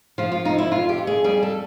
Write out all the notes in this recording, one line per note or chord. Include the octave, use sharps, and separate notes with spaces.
F3 F4
F4
F2 D#4
E4
F2 F4
G4
F2
G#4
G3 G#4
A4